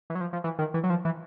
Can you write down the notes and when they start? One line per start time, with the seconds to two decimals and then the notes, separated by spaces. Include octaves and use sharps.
0.10 E3
0.15 F#3
0.21 F3
0.33 F3
0.44 E3
0.59 D#3
0.74 E3
0.84 F#3
0.90 F3
1.05 E3